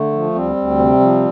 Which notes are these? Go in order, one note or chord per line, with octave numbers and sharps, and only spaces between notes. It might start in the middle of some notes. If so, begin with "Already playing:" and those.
Already playing: D3 A3
F3
D2 G3 C4
D2
C3
F3